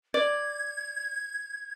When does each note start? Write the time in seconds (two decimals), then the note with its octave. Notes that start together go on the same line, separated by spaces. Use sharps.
0.14 D5 G#6